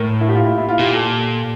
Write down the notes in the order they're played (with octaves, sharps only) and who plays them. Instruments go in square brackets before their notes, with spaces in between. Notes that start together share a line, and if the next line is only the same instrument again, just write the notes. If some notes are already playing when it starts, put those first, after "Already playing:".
Already playing: [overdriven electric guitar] A2 [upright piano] A#4
[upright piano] E4
G4
F4
E4
E4
F4
[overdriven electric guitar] A#2 [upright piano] G4
[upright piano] A4